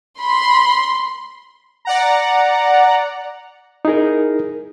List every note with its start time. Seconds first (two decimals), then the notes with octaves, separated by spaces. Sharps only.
0.21 B5 C6
1.85 D5 F#5 A#5
3.85 D#4 E4 G#4 A#4